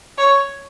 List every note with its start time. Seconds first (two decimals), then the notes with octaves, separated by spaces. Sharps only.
0.18 C#5